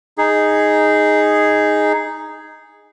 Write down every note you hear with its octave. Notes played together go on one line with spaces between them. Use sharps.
D#4 G#4